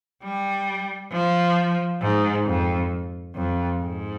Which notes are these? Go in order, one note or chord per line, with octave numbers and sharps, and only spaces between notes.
G3
F3
G#2
F2
F2
G#2